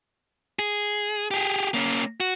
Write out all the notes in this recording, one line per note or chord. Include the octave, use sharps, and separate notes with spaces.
G#4
G4 G#4
A#3 C#4
F#4